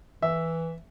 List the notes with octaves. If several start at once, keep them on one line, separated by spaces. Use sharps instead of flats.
E3 E5